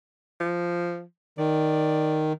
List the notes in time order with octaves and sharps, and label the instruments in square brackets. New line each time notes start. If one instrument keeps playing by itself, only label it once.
[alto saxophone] F3
[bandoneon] D#3 [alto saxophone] D5